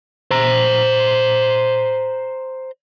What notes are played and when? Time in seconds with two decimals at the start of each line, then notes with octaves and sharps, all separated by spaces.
0.31 C5 A#5